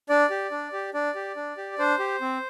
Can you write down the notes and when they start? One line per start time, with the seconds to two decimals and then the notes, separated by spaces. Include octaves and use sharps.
0.09 D4 D5
0.30 G4
0.51 D4
0.73 G4
0.94 D4 D5
1.15 G4
1.36 D4
1.58 G4
1.79 D4 C5
1.99 G4
2.21 C4